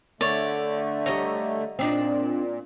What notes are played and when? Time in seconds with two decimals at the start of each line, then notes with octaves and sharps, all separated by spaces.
0.21 D3 A3 C#5 D5
1.06 G3 C#5 D#5 A#5
1.79 A#2 C4 D4 D#4